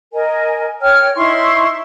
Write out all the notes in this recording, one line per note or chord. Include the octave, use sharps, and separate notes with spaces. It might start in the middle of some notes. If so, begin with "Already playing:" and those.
A#4 D#5 G#5
C#5 G5 F6
D#4 E4 C6 C#6